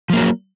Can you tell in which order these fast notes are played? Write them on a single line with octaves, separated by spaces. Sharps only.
F3 A#3 F#3